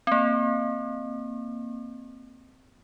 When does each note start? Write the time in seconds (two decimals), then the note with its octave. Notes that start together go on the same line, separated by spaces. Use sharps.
0.07 A#3 C4